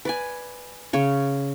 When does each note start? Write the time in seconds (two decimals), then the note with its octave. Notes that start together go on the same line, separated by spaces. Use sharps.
0.05 B4 D5 G#5
0.93 C#3 C#5